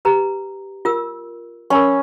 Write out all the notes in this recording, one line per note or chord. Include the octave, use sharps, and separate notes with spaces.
G4 B4 A#5
F4 A#4 E6
C#4 A#4 B5 C#6